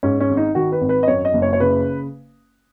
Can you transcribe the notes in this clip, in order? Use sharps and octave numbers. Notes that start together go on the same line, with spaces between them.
G#2 C#4
C#4
G#1
D#4
D#3 F#4
B4
G#1
B4
D#5
F#2 C#5
D#5
F#1
C#5
C#5
C#3 B4